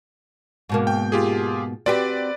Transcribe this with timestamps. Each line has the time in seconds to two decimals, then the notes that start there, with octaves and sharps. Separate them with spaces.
0.69 G#2 B2 A#3
0.87 G5
1.12 F4 G4 G#4
1.86 C4 F#4 G4 B4 D5